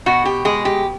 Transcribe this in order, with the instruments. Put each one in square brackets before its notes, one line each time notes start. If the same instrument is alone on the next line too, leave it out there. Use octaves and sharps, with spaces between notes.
[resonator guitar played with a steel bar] B2 F#4
G4
G#3 G#4
G4